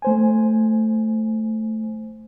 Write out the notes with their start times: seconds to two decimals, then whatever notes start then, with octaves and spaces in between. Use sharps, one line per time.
0.02 A3 C5 G#5